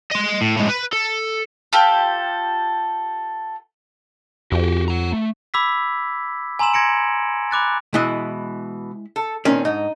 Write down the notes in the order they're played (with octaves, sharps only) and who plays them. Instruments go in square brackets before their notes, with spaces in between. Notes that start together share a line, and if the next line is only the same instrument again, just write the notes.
[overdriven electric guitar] D#5 C6
A2
A2 G#3
B4
A4
[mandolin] F4 G4 A4
[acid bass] F2 [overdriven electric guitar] F#4 G4
[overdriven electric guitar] F#5 A#5
A3
[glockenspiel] B5 D6 E6 G#6 B6
G#5 A#5 C6 E6 E7 F#7
C6 G#6 A#6 C#7 D7
B5 D6 F#6 A6
[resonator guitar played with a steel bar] B2 E3 [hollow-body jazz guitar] G#3 E4 D#5
[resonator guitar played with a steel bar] A4
[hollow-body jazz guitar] A#2 D#3 C4 [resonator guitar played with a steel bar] C#4
[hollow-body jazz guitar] G#2 [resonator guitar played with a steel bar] D#4